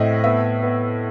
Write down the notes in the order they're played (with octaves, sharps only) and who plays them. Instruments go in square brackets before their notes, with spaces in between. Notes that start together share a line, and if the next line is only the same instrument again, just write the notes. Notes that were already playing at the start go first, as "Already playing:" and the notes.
Already playing: [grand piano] A2 C4 D#5 E5
B3 E5
B3